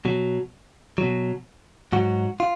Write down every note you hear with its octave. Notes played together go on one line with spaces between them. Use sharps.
B2 F#3
B2 F#3
G#2 F#3 F#4
F4